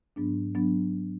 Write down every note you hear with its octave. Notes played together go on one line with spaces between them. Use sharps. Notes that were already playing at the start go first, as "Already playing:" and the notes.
G#2 F#3 B3 D4
F#3 B3 D4